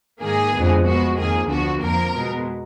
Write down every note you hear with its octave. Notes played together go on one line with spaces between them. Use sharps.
G#2 D#3 A#3 G#4
F2 D3 G#3 B3
B2 G#3 B3 F#4
F2 D#3 A#3 G#4
D2 D3 F3 B3 F#4
F2 F3 A#3 A#4
B2 G#3 B3